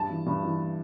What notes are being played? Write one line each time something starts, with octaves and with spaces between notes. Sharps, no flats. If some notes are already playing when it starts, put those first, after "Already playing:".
Already playing: G2 A5
E3
G2
E3